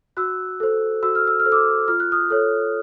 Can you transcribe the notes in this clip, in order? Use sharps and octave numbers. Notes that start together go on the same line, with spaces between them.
F#4 E6 F#6
A4 C5
F#4 E6
F6
E6
F6
A4 C5
D6 E6
F4 F6
F#6
D#6 F6
A4 C#5